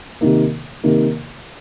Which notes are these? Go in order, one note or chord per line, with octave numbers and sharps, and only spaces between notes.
C3 D#3 A#3
C3 D#3 A#3